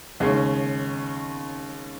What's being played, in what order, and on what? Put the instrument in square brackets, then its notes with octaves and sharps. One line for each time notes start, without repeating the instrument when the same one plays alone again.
[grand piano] D#2 C#3 G#3 C#4